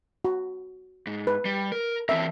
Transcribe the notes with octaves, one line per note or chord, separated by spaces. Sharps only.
F#4
G#2
B4
G3
A#4
E3 C4 A#4 E5